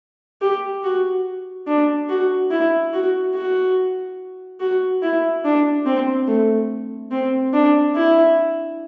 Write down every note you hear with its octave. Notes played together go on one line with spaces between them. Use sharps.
G4
F#4
D4
F#4
E4
F#4
F#4
F#4
E4
D4
C4
A3
C4
D4
E4